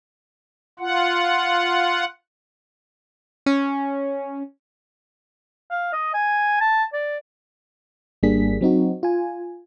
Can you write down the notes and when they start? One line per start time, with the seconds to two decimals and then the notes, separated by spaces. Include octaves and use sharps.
0.79 F4 F#5
3.46 C#4
5.71 F5
5.93 D#5
6.14 G#5
6.61 A5
6.94 D5
8.23 G#1 G3 A#3 D4 G#4 B6
8.61 F#3 C4 D#4 F#4
9.03 F4 G#5